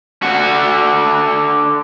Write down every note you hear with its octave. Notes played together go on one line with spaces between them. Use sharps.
D3 F#4